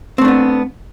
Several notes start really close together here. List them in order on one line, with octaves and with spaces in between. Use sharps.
C4 A3 D4 B3